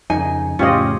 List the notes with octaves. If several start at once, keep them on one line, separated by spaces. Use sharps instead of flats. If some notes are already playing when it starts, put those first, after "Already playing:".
F2 C#3 D#4 G#5
F2 A2 C#3 C#4 F4 G4 C5 D#5